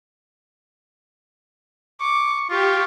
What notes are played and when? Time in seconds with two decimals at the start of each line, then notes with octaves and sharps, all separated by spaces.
2.01 C#6 D6
2.50 F4 G4 C#6